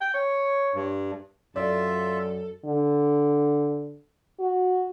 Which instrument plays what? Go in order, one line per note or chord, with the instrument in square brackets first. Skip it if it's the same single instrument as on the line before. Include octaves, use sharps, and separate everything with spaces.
[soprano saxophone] G5
C#5
[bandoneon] G2
[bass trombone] F#2 [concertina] F4 E5 [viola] A4 [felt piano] D5
[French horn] D3
F#4